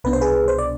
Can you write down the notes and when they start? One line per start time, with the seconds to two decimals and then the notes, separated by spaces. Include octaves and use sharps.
0.04 C2 B2 B3 D4 B4
0.13 C5
0.21 G#4 B4
0.48 C5
0.59 D5